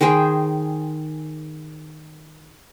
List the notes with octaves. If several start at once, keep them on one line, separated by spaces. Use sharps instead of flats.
D#3 G#4 C5 G5